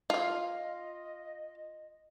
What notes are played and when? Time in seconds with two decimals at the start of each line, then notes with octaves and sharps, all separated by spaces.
0.10 F4 D#5 F5